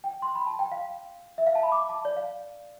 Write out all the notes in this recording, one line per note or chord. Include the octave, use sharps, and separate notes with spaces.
G5
C6
B5
A5
G5
F5
E5
F5
A5
B5
D6
A5
D5
F5